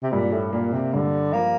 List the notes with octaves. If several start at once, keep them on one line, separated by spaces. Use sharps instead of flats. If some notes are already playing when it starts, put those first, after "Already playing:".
C3
G2 A#2
A2
A#2 A#3
C3
G2 D3
F3 A#3